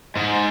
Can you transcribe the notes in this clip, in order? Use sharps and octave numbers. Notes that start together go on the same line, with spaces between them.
G#2